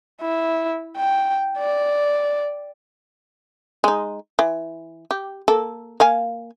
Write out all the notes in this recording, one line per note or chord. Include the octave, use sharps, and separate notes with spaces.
E4
G5
D5
G#3 D#4
E3
G4
A#3 A4
A#3 F5 G#5